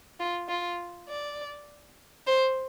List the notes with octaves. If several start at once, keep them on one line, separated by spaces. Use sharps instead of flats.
F4
F4
D5
C5